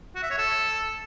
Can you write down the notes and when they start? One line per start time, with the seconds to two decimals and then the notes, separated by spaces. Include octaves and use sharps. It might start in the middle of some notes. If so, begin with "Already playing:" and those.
0.15 F#4
0.23 E5
0.31 C#5
0.38 A4